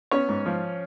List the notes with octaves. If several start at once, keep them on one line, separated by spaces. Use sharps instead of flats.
B3 C#4 C#5
G#2
F3